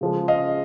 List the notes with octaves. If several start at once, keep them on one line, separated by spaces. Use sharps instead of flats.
C#3 F3 G#3
D#5 F5